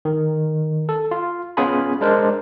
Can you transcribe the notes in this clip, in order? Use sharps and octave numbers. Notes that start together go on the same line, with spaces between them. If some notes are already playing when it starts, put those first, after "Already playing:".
D#3
A4
F4
B3 C#4 F4 G#4 G#5 B5
G#3 D4 A#4 C5